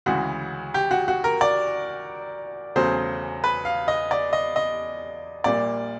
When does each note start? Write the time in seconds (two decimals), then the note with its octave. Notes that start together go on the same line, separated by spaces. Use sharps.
0.06 D2 C#3 E3 G#3 F#4
0.74 G4
0.91 F#4
1.08 F#4
1.24 A#4
1.41 D5
2.76 E1 E2 C#3 F#3 A3 C5
3.44 B4
3.65 F5
3.88 D#5
4.11 D5
4.33 D#5
4.56 D#5
5.44 A#1 A#2 G3 A#3 D5